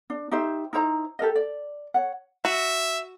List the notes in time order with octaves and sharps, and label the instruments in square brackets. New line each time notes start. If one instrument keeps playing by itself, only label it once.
[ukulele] D4
D#4 G4 C5 E5
D#4 E4 C5 A#5
G4 A4 A#4 D#5
D5
C#5 F#5
[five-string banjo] F#4 [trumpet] E5